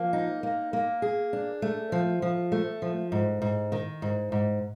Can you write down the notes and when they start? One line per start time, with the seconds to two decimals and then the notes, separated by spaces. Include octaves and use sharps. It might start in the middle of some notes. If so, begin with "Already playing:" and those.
Already playing: F3 A#3
0.13 D#4
0.43 A#3
0.73 A#3
1.02 G#4
1.33 D4
1.62 A3
1.92 F3
2.22 F3
2.52 A3
2.82 F3
3.12 G#2
3.42 G#2
3.72 D#3
4.02 G#2
4.32 G#2